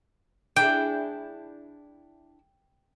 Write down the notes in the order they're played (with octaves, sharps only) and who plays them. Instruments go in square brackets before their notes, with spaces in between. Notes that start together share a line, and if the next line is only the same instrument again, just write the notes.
[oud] D4 E4 G#4 [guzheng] G5